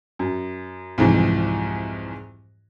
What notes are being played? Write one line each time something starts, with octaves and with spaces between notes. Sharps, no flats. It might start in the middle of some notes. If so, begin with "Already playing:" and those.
F#2
C2 F2 G#2 E3